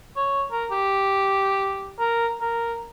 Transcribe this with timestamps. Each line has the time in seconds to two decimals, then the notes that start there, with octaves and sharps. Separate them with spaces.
0.16 C#5
0.51 A#4
0.71 G4
1.99 A#4
2.41 A#4